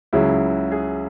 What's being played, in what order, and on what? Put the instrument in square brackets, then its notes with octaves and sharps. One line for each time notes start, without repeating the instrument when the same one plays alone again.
[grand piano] C#2 C#3 F#3 E4
G#4